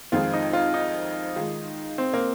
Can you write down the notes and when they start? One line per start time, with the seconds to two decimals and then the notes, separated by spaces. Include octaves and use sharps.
0.12 F2 D#3 G#3 C4 F4
0.33 D#4
0.53 F4
0.74 D#4
1.36 D#3 G#3 F4
1.98 C4
2.14 A#3